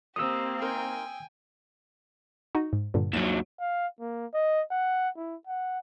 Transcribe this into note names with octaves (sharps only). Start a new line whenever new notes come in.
A#3 C4 G4 C5 D#5 D#6 E6
D#4 A#4 C5 G5 G#5
D#4 F#4
G#2
G2 A#2 D3
D#2 F#3 E7
F5
A#3
D#5
F#5
E4
F#5